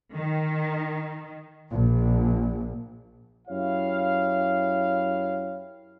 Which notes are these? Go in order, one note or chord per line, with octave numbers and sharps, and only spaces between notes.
D#3
A#1
F#2 E4 G4 C#5 F5